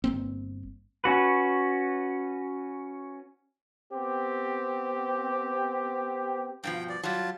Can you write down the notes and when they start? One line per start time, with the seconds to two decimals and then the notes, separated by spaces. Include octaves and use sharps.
0.04 G1 A#3 C4
1.04 C#4 F#4 B4
3.92 B3 C4 G4
6.64 G2 B2 F3 G5
6.89 D5
7.03 F#3 G3 F4 A5